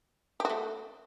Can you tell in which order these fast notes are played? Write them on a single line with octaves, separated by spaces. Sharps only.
G4 F#4 A3